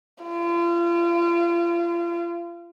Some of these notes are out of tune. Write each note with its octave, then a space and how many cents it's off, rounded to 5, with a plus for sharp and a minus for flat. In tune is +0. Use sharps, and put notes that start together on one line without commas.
F4 -35